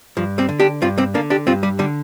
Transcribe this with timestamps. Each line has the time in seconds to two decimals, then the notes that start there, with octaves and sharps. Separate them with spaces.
0.17 G2 F3
0.38 G3 C4
0.49 D3
0.59 D4 G4
0.82 G2 C4 F4
0.98 G3 C4
1.14 D3 A#3 D4
1.30 D4 G4
1.47 G2 C4 F4
1.63 G3
1.79 D3 G3